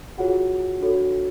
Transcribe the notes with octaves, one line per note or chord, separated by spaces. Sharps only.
F4 F#4 G#4 C#5 F#5
D4 F#4 A4 C#5